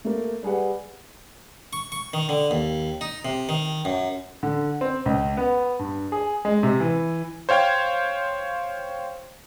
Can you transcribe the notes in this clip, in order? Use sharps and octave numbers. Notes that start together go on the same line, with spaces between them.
A3 A#3
G3 G#4 B4 F#5
C#6
C#6
D#3
D3
D#2
D#4
C3
D#3
F#2
D3
C4
C#2
B3
G2
G#4
G#3
C3
E3
C5 C#5 F5 G5 G#6